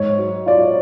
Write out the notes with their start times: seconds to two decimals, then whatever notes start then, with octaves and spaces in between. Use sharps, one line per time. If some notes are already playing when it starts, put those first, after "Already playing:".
Already playing: G#2 C#5
0.18 F#3
0.46 F4 D5
0.62 C#5